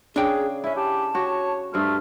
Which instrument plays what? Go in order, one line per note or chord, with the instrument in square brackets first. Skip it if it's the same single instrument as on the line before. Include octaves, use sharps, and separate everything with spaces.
[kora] C#3 [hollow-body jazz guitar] D4 G5 [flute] G#4
[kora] C#4 E4 [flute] E5
[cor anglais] G4 [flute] A5
[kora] F#4 G4 [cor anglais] C#5
[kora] G2 C5 [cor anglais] A3 [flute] F6